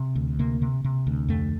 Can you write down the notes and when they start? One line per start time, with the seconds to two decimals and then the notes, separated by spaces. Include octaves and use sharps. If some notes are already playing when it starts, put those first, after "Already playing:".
Already playing: C3
0.15 D2
0.39 C3 A#3
0.62 C3
0.84 C3
1.07 D2
1.29 F2 A3